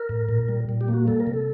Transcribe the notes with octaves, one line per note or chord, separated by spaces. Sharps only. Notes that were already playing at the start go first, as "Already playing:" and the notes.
Already playing: A#4
A2
A#2
G3
A#2
G4
A#3
F#4
G3 A4
A#4
C3
A4